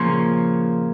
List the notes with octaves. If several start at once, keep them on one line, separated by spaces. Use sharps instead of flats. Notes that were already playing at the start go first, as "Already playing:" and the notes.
Already playing: A#2 C#3 F3 C#4 F4 C#5